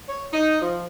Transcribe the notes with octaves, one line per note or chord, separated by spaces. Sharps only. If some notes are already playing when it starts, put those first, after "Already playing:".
C#5
D#4
F3